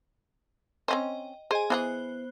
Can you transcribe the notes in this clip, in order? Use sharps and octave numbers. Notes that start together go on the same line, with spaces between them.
C4 C#4 C5 D#5 G5
G#4 C5 D#5 G#5
E3 B3 D#4 G#4 C5 F#6